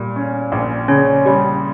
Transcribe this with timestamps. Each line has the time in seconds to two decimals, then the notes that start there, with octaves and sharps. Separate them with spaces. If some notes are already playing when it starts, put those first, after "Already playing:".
Already playing: A#2 G3
0.16 C#4
0.52 A#1
0.88 C#3 C#4 C#5
1.26 G3